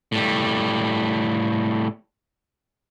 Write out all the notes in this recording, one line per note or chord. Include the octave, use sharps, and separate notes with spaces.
A2 G3